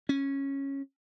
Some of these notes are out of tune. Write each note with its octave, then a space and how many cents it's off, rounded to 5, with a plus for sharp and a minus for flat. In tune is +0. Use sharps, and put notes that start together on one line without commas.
C#4 -10